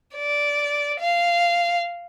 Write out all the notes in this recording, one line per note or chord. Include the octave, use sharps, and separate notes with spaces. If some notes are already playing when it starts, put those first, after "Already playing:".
D5
F5